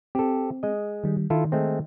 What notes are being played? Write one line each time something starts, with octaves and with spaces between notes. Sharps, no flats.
C4 G4 A4
G#3 D#5
D#3 G3
D#3 E4 F4 A4
G#3 A3 C4